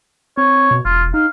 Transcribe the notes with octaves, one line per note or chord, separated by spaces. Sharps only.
C4 C#5
B2
E1 F4
D#4 F5